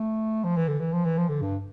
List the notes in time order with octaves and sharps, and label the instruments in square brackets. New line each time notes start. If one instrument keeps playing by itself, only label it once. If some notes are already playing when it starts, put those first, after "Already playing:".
Already playing: [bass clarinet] A3
F3
E3
D3
E3
F3
E3
F3
D3
G2